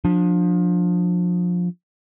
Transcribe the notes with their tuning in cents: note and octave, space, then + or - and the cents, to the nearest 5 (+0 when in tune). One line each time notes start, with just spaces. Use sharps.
F3 +25 D4 +5